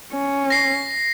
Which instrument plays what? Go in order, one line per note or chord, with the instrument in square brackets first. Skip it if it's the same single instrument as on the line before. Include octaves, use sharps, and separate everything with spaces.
[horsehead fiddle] C#4
[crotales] A#6 C7